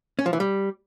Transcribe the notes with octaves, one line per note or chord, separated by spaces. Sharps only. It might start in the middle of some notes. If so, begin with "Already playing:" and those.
C#4
F3
E3
G3